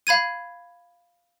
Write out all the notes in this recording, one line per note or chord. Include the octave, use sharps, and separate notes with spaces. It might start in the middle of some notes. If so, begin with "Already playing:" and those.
F5 B5 G#6 D#7